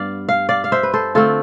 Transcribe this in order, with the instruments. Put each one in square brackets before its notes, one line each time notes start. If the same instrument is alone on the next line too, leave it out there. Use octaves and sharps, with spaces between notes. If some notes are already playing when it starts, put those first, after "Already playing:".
Already playing: [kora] G2 B3 D5 F5
F5
D5 F5
F5
C5 E5
B4
A4 C5
D3 A3 C4 F4 A4